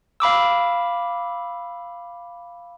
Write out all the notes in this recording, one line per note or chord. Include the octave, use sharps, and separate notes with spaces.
F5 B5 D6 E6